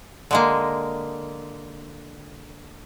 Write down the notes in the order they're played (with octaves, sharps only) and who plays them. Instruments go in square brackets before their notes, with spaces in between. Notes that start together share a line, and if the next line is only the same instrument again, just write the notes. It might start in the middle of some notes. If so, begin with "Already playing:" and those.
[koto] D3 G#3 A#3